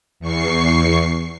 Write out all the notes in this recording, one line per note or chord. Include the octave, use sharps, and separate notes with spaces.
E2 C#6 C7